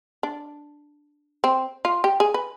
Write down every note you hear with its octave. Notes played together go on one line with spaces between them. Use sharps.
D4
C4
F4
G4
G#4
B4